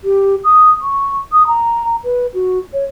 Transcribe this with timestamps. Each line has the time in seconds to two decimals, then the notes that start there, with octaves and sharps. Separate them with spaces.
0.04 G4
0.44 D#6
0.81 C#6
1.32 D#6
1.47 A#5
2.04 B4
2.34 F#4
2.73 C#5